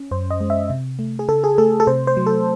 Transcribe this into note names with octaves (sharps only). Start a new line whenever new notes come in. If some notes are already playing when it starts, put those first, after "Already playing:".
Already playing: C#4
F#2 C5
D#5
G#3
E5
C3
A3
G#4
C#3 A4
G#4
A3 A4
A4
C3 C5
C5
F#3
A4